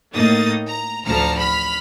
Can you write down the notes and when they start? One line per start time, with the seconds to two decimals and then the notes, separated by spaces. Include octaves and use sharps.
0.14 A2 A#3 D#4 D#6 A6
0.69 A#5
1.05 A1 D2 F3 A5 A#5 F6
1.39 B5 F6 B6